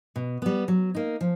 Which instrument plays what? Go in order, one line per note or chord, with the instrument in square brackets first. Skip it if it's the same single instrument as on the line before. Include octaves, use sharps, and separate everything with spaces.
[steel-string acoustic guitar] B2
G3 B3
F#3
A#3 D#4
F3